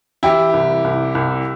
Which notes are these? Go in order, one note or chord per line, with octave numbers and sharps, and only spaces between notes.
E3 E4 G4
C2
C2
C2